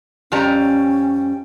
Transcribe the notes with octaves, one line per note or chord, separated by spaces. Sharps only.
F2 G3 C#4 A#5